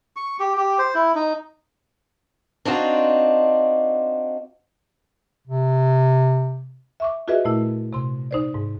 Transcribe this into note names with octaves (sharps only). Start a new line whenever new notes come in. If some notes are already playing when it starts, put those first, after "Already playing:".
C#6
G4
G4
C5
E4
D#4
C4 D4 D#4 F4 F#4
C3
E5 C#6 D6
F4 F#4 G#4 B4 D#5 E5
A#2 A3 E4
C3 C6
D#4 C5 D5
G#2